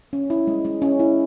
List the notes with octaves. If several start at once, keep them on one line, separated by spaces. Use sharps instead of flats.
C#4
E4
G#3
G#3
C#4
E4